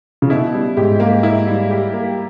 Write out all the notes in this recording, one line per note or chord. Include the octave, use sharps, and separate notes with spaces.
C#3
B2 E4
G3
G#2 G4
A#3
E4
G3
G4
A#3